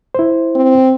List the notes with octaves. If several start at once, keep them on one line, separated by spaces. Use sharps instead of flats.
E4 C5
C4